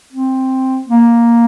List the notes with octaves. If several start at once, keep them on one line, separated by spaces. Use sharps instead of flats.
C4
A#3